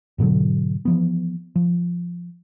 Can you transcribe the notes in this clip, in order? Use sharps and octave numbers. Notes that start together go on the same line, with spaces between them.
G#2 B2 D3 F#3
E3 F3 B3
F3